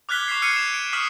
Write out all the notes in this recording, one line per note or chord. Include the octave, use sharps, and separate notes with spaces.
D6 F6 F#6 G#6 B6 G7
C#6 D6 B6 C7
E6 F6 G#6 C7 C#7 D#7
E7
D7
C#6 D#6 F6 B6 C7